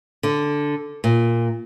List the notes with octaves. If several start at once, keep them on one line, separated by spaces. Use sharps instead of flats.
D3
A#2